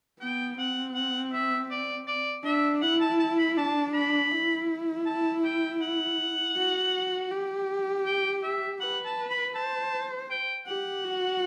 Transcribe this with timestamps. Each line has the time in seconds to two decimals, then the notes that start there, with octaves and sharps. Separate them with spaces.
0.20 B3 G5
0.58 C4 F#5
0.95 F#5
1.33 E5
1.71 D5
2.07 D5
2.44 D4 E5
2.82 E4 F#5
3.01 A5
3.20 A5
3.38 B5
3.57 D4 A5
3.94 B5
4.32 E4
5.06 A5
5.44 G5
5.82 F#5
6.56 F#4
7.30 G4
8.06 G5
8.43 E5
8.81 B4 F#5
9.06 A5
9.30 B5
9.55 C5 A5
10.30 G5
10.67 G4 F#5
11.05 F#4